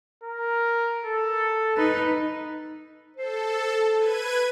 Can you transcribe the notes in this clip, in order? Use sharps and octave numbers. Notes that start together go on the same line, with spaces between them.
A#4
A4
D#4 B4
A4 C5
B4 G#6 D#7